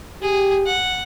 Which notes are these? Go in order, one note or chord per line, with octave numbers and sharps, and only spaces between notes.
G4 G#4
F#5